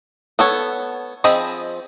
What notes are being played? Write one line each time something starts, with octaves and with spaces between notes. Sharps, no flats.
B3 A4 C#5
F3 C4 G#4 D#5 B5